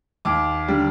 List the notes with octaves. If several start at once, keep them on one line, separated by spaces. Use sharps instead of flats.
D#2 D6
D3 G3